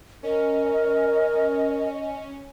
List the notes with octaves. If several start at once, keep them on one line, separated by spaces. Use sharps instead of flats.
C#4 A#4 D#5